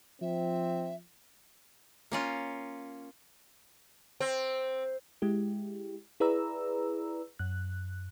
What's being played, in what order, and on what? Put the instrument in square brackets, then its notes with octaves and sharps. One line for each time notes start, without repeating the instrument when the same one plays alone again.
[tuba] F3 [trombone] C4 [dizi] E5
[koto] A#3 C#4 F4
[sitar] C4
[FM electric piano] G#3 E4 G4
E4 G#4 B4 D5 A#5 E6
F#2 F#6